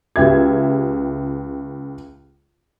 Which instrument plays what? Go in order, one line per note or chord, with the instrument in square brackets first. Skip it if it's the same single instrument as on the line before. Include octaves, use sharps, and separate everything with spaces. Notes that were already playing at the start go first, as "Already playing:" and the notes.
[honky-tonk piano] C#2 G4 E5 G#6